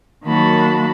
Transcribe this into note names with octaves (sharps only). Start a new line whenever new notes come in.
D#3 F#3 A#3 F#4 A5 B5